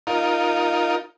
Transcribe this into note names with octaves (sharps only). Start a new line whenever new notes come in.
D#4 F4 A#4